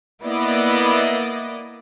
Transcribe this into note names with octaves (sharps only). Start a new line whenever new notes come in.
A#3 B3 E4 D5 D#5